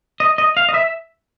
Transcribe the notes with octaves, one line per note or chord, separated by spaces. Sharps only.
D#5
D#5
F5
D#5
E5